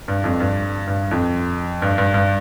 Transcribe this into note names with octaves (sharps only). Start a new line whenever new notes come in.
G2
F2
G2
G2
F2
G2
G2
G2